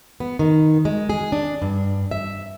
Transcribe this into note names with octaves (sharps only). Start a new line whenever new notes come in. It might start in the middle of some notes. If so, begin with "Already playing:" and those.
B3
D#3
G#3
G#4
D4
G2
E5